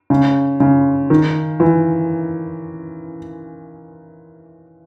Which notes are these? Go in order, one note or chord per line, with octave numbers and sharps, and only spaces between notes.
C#3
C#3
D#3
E3